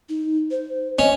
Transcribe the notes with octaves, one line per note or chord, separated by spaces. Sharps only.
D#4
C5
C#4 D#5